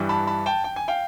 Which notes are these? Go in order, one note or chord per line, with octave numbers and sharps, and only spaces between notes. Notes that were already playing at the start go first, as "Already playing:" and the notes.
Already playing: G2 E3 G3
A5 B5
A5 B5
G5 A5
G5
G#5
F5 G5